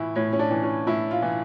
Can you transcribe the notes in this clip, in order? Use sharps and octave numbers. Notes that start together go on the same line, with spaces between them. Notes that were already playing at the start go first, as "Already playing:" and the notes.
Already playing: A2 E3 E4
A2 C#5
C#4
D4
E3
C#4
A2 E4
F4
E3